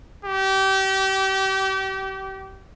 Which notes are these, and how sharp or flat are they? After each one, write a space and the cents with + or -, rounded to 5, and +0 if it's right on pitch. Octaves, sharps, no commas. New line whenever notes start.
G4 -30